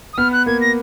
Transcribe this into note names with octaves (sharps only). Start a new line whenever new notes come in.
D#6
B3 F6
F#6
A#3 G#6
A#6